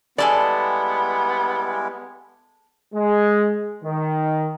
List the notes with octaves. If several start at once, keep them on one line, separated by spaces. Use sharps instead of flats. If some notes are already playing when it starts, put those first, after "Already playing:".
G3 G#3 B3 E4 G#4 A4 D5 A5
G#3
D#3